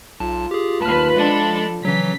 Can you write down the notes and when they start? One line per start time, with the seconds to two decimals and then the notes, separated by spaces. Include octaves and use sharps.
0.20 B1 F4 A5
0.51 G4 G#4
0.82 D#2 B4 A5 F6
1.16 F3 G#3 D4 A4 B5 A6
1.85 C#3 E3 F#3 B6